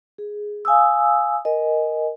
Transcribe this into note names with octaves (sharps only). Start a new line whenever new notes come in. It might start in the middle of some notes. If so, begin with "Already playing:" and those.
G#4
F5 G#5 D#6 E6
A#4 D#5 G#5